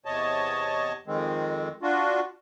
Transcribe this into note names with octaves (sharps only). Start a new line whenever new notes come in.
E2 C3 C#5 D#5 A5
F2 D#3 G#3 C4
D4 F4 F#4